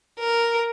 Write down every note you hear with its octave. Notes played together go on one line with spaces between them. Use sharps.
A#4